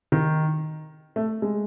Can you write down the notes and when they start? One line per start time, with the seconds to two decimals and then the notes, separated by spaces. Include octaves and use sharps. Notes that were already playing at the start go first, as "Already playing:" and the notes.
0.12 D#3 D#4
1.16 A3
1.42 G#3